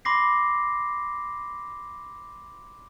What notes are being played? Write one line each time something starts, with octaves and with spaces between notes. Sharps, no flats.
B5 C6 D6 A#6 C7